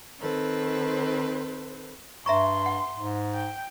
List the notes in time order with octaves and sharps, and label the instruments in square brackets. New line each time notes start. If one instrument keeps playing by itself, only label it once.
[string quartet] D#3 C4 A4 B4 C5
[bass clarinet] G2 [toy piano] E5 A#5 C#6 [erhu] C6
[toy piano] F#5
[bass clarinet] G#2
[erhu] G5